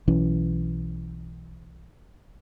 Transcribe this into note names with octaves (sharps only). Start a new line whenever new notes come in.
B1 E3 C#4